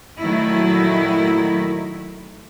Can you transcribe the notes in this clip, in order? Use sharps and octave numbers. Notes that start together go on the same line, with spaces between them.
A#2 D#3 F#3 A3 E4